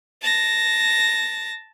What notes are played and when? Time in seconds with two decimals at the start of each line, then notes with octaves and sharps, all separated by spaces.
0.22 A5 A#6